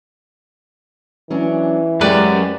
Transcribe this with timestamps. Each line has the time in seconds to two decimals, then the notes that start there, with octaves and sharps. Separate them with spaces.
1.30 E3 F#3 C#4 D4
2.01 F#2 G#3 C4 G4 B4 D5